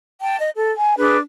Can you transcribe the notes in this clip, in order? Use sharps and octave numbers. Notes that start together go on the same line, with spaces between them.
G5 A5
D#5
A4
G#5
D4 G#4 B4